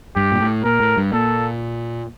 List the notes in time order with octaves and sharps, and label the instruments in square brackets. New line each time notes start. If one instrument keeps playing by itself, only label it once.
[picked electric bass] G2 [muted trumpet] G4
[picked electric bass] A#2
A2
[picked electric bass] A#2 [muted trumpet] A#4
[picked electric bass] A2
G2
[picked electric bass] A#2 [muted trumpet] A4